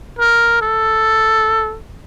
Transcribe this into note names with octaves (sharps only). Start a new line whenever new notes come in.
A#4
A4